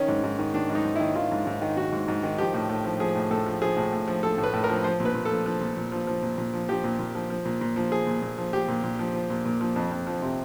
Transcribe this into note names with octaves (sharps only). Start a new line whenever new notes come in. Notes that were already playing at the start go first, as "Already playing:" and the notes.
Already playing: D#3 C#4
G#2
G#2
D#3
D#3 D4
G#2
D#4
G#2
E4
D#3
D#3 F4
G#2
G#2
D#3
D#3 F#4
G#2
G#2
D#3
F3 G4
A2
A2
F3
F3 G#4
A2
A2 A4
F3
F3 G#4
A2
A2
F3
F3 A4
A2
B4
A2
A#4
F3
F3 C5
A#2
B4
A#2
A4
F3
F3
A#2
A#2
F3
F3
A#2
A#2
F3
F3 G4
A#2
A#2
F3
F3
A#2
A#2
F3
F3 G#4
A#2
A#2
F3
F3 G4
A#2
A#2
F3
F3
A#2
A#2
F3
F2
F2
F3
C3